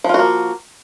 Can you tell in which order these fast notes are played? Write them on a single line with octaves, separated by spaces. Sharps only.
F3 F4 F#4 A#3